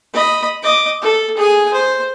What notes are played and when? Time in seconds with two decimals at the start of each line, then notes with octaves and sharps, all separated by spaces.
0.13 D#5 B5
0.63 D#5 D6
1.02 A4
1.37 G#4 G#5
1.73 C5